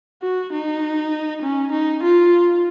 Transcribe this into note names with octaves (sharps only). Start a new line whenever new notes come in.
F#4
D#4
C#4
D#4
F4